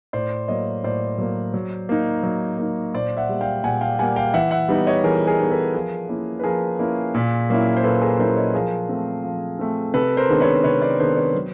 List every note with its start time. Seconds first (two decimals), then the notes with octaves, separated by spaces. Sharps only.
0.13 A2 C5 D5
0.48 F#3 A#3 C#5 D#5
0.84 A2 C5 D5
1.18 F#3 A#3
1.54 F#3
1.89 A#3 D#4
2.23 F#3
2.58 A#3 D#4
2.94 A#2 C5 D5
3.17 E5 F#5
3.29 G3 A#3
3.41 F5 G5
3.63 A#2 F#5 G#5
3.81 F5 G5
3.99 G3 A#3 F#5 G#5
4.16 F5 G5
4.34 E3 E5 F#5
4.51 E5 F#5
4.68 G3 B3 D#4
4.87 C#5 D#5
5.04 E3 G#4 A#4
5.27 G#4 A#4
5.39 G3 B3 D#4
5.51 A4 B4
5.74 F3 G#4 A#4
6.09 A#3 C#4 E4
6.40 B4
6.44 F3 G#4 A#4
6.79 A#3 C#4 E4
7.15 A#2
7.50 F#3 A#3 C#4 E4
7.77 C5
7.84 A#2 A4 B4
8.01 G#4 A#4
8.19 F#3 A#3 C#4 E4 A#4 C5
8.36 C#5 D#5
8.54 F3 G#4 A#4
8.89 A3 C4
9.24 F3
9.59 A3 C4
9.94 C3 A4 B4
10.17 A#4 C5
10.29 D#3 G#3 B3 D4
10.41 B4 C#5
10.64 C3 B4 C#5
10.82 C5 D5
10.99 D#3 G#3 B3 D4 A#4 C5
11.17 B4 C#5
11.34 F#3